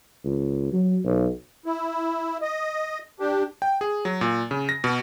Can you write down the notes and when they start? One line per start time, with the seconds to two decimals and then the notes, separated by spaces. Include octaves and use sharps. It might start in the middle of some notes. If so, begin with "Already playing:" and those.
0.24 C#2
0.72 F#3
1.04 B1
1.66 E4
2.41 D#5
3.20 D4 G4
3.62 G5
3.81 G#4
4.05 F#3
4.21 A#2
4.51 C#3
4.69 A#6
4.84 B2